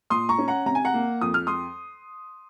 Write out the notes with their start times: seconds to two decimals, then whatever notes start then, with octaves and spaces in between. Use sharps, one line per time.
0.10 A#2 C6 D#6
0.29 A#5 C#6
0.38 C#4
0.48 F#5 A#5
0.66 C3 A#5
0.75 G#5
0.85 F#5 A#5
0.94 A#3
1.21 F2 D#6
1.34 F6
1.47 C6 D#6